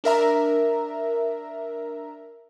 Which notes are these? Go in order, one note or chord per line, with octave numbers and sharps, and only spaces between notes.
D4 A#4 E5 A#5